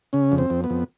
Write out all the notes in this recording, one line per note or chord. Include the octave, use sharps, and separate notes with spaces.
C#3 C#4
F2
C4
F2
B3
F2